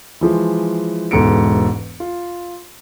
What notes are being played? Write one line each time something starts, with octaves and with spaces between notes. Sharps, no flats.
E3 F3 G#3
E1 E2 G#2 A4 C#7 D7
F4